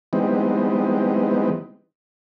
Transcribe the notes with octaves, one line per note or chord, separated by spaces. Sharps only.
E3 G3 G#3 B3 C4 D#4